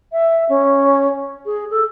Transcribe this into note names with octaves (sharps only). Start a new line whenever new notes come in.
E5
C#4
G#4
A4